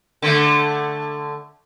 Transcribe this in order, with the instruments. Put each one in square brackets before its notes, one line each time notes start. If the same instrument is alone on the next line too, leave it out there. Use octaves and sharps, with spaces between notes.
[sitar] D3 A3